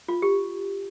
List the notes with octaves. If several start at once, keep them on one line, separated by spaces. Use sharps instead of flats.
F4
G4